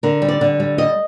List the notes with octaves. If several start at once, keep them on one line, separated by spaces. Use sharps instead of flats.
D3 A#4
G3
D5
D3
G3
G3 D#5